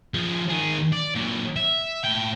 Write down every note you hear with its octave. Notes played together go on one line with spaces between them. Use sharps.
F3 G#4
D#3 G#4
D5
A#2 F#3
E5
A2 G5